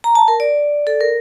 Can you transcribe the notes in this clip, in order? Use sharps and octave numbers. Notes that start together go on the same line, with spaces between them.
A#5
A5
A#4
D5
A4
A#4